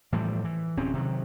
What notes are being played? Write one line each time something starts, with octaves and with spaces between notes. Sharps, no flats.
A2 E3 F3 G3
E3
D1 C4 C#4
C3 D#3 F#3